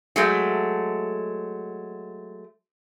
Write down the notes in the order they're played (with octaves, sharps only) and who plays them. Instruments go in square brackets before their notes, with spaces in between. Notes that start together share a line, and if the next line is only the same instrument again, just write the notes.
[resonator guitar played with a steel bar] F#3 G#3 A3